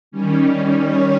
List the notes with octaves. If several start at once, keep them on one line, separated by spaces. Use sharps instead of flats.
D#3 G3 C#4
C#5